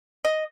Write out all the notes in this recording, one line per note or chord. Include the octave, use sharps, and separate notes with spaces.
D#5